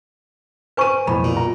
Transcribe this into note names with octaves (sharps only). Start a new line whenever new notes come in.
B4 C5 G#5 C#6 D#7
B1 F2 A2 B5
A#2
A#5